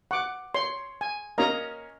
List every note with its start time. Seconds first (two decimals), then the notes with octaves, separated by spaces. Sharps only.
0.11 F#5 C#6 D6
0.54 C#5 C6
1.01 G#5
1.38 A#3 C#4 D#5 A#5